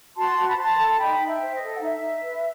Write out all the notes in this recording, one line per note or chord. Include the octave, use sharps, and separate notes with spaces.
F#4 A5 C6
F#4
B5
C5 A5 C6
A4
D#4 G5 B5
D#4
E5 G5
C5
D#5
A4
F#5
D#4 E5
D#4
B4